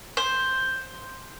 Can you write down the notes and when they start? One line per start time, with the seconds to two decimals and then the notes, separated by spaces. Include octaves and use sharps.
0.17 C5